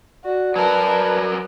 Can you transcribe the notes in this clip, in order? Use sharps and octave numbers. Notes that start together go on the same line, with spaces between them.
F#4 D5
F#3 A#4 B4 A5